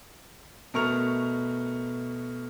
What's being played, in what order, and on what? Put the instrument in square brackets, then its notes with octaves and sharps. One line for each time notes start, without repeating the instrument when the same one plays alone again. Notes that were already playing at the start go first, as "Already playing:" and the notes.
[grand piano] B2 A3 A#4 C#6 F6 F7